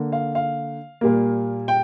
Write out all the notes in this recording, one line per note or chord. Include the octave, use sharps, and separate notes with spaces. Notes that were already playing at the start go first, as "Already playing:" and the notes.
Already playing: D3 A#3
F5
F5
A#2 G3 A#3
G5